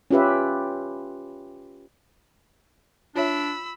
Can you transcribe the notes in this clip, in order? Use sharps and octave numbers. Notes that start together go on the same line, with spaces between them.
C#4 F4 G4 B4 E5
D4 F4 C#5 E5 B5 E6